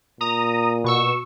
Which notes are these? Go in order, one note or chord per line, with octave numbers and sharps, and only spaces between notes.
A#2 A#5 D#6
B2 C#6 E6